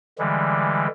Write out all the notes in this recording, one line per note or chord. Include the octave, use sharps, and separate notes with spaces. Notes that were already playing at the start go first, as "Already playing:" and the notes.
D3 E3 G3 G#3